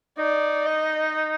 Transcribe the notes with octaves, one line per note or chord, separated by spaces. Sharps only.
D#4 D5
D#5